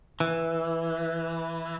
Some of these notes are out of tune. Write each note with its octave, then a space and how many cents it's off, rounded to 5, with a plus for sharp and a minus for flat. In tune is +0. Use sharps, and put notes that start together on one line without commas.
E3 +0